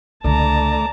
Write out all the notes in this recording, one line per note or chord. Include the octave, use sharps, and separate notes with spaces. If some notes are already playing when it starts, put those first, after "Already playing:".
C#2 D3 A3 D5 A5 A#5